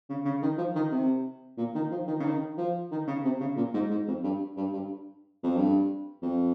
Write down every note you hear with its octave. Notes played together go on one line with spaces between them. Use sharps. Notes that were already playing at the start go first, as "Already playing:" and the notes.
C#3
C#3
D#3
F3
D#3
C3
A#2
D#3
F3
D#3
C#3
D#3
F3
D#3
C#3
C3
C#3
A#2
G#2
G#2
F2
G2
G2
G2
F2
G2
F2